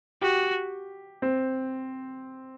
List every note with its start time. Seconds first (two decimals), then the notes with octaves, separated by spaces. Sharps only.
0.22 F#4 G4
1.22 C4